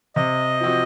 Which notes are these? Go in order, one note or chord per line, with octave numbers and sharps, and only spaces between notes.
C3 D#5
F3 C4 F#4